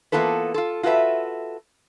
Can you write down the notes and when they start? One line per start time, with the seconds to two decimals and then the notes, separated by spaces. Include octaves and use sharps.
0.12 E3 A#3 B3 F4 A4 B4
0.54 F4 A4
0.83 F4 F#4 A4 B4 E5